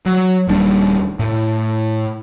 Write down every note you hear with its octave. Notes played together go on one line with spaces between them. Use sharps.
F#3
D#1 D#2 G3 D4
A2